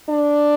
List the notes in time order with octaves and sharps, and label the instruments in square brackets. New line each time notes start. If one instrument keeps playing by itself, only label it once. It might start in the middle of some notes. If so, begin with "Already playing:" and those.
[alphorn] D4